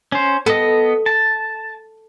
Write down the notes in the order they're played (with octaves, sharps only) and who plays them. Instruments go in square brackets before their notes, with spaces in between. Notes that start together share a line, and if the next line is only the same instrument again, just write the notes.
[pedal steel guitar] C#4 C5
[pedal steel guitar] B3 D#5 [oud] A4
[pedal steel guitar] A5